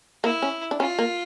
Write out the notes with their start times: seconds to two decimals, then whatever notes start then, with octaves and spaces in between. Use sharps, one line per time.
0.23 A#3 E4
0.42 C#4
0.71 D4
0.80 C#4 F4
0.99 A#3